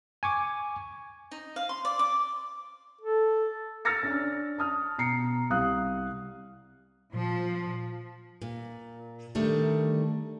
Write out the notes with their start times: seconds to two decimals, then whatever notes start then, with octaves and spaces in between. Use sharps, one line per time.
0.23 G#5 C#6 D6
1.31 D#4
1.56 F5
1.69 C6
1.85 D5
1.99 D6
3.01 A4
3.85 E6 F6 A6 A#6 C#7
4.03 C#4 D4
4.58 A5 D#6 F6
4.98 B2 A#5 C7 C#7
5.50 C2 F5 D#6 F#6
7.13 A#2 F3
8.42 A#2
9.35 D3 D#3 G3 A3